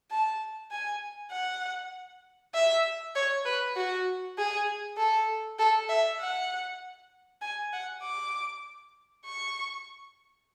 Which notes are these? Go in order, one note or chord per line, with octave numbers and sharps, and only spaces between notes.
A5
G#5
F#5
E5
C#5
B4
F#4
G#4
A4
A4
E5
F#5
G#5
F#5
D6
C#6